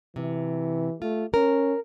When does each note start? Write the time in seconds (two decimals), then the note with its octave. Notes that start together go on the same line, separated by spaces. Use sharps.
0.16 C3 E3
1.02 A3 F4
1.34 C#4 A#4